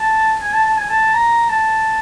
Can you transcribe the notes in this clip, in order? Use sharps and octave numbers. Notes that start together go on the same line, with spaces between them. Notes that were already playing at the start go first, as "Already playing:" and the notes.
Already playing: A5
G#5
A5
A5
G#5
A5
A#5
A5